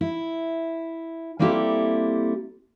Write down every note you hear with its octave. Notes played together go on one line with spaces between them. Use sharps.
E4
G3 A#3 C4 E4 G4 A4